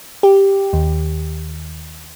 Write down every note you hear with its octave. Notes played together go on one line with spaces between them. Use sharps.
G4
D#2